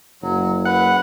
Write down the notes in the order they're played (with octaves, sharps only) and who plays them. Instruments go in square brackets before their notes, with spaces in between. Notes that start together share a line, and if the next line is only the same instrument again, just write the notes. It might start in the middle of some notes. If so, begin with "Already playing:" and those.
[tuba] F#1 [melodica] F#3
[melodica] B4 [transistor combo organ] F#5